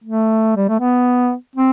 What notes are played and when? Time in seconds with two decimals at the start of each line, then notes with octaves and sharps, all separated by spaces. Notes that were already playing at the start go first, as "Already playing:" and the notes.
0.04 A3
0.56 G3
0.69 A3
0.80 B3
1.56 C4